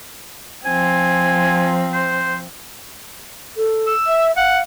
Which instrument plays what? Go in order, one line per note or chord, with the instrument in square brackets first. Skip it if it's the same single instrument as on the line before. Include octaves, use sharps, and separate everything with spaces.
[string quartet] F3 C4 [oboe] G#5
[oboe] C5
[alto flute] A4
[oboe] E6
[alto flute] E5
[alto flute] F5 [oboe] F#5